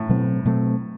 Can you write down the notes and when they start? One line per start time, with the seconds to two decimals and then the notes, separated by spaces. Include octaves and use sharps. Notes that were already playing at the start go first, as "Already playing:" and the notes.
Already playing: A2
0.09 B2 F#3 A3 C4
0.45 B2 F#3 A3 C4